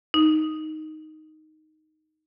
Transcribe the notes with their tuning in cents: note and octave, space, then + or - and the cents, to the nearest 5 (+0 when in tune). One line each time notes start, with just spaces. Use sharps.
D#4 +0